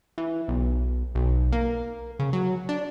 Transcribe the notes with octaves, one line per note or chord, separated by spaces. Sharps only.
E3
B1
B1
A#3
C#3
F#3
D4